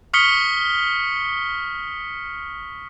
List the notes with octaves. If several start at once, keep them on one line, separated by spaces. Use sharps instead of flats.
C#6 D#6 F6 B6 C#7 G7